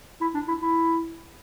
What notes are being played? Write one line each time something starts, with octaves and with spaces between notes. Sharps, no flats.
E4
D4
E4
E4